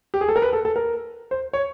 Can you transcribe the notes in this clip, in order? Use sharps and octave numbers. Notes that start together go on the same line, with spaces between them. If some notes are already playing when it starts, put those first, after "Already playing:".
G4
G#4
A4
A#4
B4
A4
A4
A#4
C5
C#5